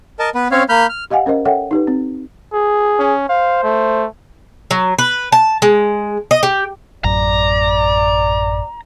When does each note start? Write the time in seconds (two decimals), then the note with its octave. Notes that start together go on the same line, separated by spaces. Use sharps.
0.19 A#4 D#5 A5
0.35 B3 B4
0.52 C4 C#4 C#5 F5
0.69 A#3 B5 F6 G6
0.89 F6
1.11 G4 D#5 F5 F#5 G#5
1.26 C#4 A#4 C5 D#5
1.45 A4 C#5 E5 F#5 G5
1.71 D#4 G4 B4
1.87 C4
2.54 G#4
2.99 C#4
3.29 C5 F5
3.63 A3
4.71 F#3
4.98 B4
5.32 A5
5.62 G#3
6.31 D#5
6.43 G4
7.04 A1 F#2 D5 A#5